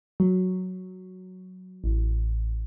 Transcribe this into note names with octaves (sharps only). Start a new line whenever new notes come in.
F#3
A1